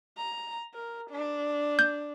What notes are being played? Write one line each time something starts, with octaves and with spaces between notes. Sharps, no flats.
A#5
A#4
D4
G6